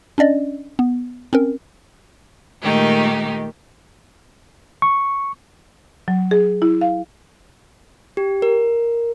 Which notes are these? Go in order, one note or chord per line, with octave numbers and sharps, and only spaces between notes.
C#4 D4 D5 D#5
B3
C4 C#4 A#4
A#2 D#3 G#3 A3 D#4 G4
C#6
F#3
G#4
E4
F5
G4
A#4